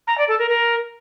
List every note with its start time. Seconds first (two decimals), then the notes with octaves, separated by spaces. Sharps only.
0.07 A#5
0.18 D5
0.28 A4
0.38 A#4
0.49 A#4